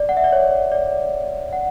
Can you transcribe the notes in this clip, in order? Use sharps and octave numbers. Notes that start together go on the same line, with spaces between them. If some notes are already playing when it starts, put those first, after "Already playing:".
Already playing: D5
F#5
E5
D5
C#5
D5
F#5